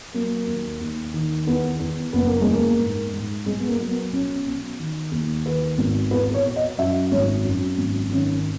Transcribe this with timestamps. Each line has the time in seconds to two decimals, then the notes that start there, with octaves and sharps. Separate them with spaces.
0.14 F#3 A#3
0.47 D#2
0.81 D#2
1.14 D#3
1.46 E2 B3
1.80 E2
2.13 F#1 B3
2.27 A#3
2.41 E2 G#3
2.54 A#3
2.79 G#2
3.13 G#2
3.46 B1 G#3
3.60 B3
3.69 A#3
3.79 F#3
3.90 B3
4.12 B1 C#4
4.46 B1
4.79 D#3
5.12 D#2
5.45 D#3 B4
5.78 G#1
6.11 E2 B4
6.34 C#5
6.45 B2
6.56 D#5
6.78 F#2 E5
7.11 G#1 C#5
7.44 F#2
7.78 G#1
8.11 D#3 C#4